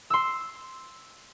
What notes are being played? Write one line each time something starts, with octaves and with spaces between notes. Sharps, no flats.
C6 E6